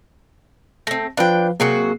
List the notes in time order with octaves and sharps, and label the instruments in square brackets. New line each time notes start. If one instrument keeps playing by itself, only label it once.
[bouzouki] A3 C4 [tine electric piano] A#6
[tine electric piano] F3 B4 F5 [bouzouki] D4 G5
[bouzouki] C3 F#3 F#4 [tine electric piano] A#3 G#4 C7